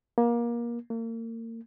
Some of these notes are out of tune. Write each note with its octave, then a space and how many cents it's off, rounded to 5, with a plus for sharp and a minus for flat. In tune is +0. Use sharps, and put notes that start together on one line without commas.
A#3 +25
A#3 -35